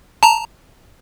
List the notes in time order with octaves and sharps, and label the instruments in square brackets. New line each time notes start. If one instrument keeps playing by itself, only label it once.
[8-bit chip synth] A5 A#5